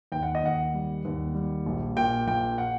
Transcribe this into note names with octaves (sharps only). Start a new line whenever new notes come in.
D#2 G5
F#5
D#5
D#2 F#5
G3
D#2
G3
A#1
A#2 G5
A#1 G5
F#5